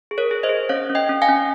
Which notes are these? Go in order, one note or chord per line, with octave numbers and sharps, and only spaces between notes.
G#4
A#4 C#5
G#4
C5 D#5
G#4
C#4 C#5 F5
C#4
D#5 G5
C#4
F5 G#5
C#4